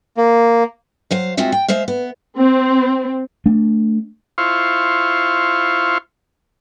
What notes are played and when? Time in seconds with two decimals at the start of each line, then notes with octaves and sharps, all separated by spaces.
0.17 A#3
1.11 F#3 C5 F5
1.37 G#3 C4 F4 F#4 E5
1.52 G5
1.68 G#3 C5 E5 F5
1.88 B3
2.37 C4
3.46 A3 D4
4.38 E4 F4 C5 F5 C#6